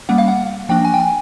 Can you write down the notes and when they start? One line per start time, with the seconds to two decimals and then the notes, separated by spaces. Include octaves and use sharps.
0.09 G3 A#3 C#4 F#5
0.18 F5
0.28 F#5
0.69 F3 A#3 D4 G5
0.85 G#5
0.94 G5
1.00 G#5